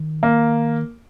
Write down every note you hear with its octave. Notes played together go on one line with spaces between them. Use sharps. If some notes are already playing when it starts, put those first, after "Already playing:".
Already playing: D#3
A#3